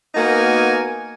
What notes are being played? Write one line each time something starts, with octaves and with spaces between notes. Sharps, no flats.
A#3 B3 D#4 F#4 A#4 G#5